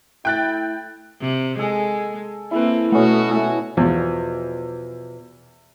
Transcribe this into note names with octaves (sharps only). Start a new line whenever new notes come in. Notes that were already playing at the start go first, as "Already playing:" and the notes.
A3 E4 G5 F#6 A6
C3
G#3 A4 G#5
A#3 C4 E4 A4 B4
B2 A3 B3 C#4 F#4 D#5
E4 G#5 A5
E2 B2 F3